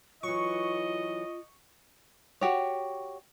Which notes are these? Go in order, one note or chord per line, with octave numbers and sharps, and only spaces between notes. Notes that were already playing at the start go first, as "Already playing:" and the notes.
E3 F#3 F4 D#5 C#6
F#4 G4 C#5